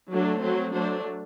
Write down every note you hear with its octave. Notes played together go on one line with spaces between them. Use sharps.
F#3 A3 D4
F#3 C4
F#3 A3 D4 C5